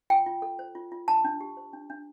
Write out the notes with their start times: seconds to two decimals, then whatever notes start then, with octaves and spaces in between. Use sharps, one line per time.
0.10 F4 G5
0.26 F4
0.42 A4
0.59 C5
0.75 F4
0.92 F4
1.08 D4 A5
1.24 D4
1.41 G4
1.57 C5
1.73 D4
1.90 D4